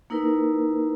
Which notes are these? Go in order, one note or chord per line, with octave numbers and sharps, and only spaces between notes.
A#3 D#4 E4 A#4 B4